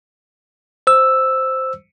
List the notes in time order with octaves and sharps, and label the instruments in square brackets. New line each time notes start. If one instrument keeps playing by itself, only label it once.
[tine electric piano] C5 E6